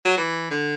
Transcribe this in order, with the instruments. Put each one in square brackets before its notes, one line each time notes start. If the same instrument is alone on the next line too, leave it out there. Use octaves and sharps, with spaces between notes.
[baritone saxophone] F#3
E3
D3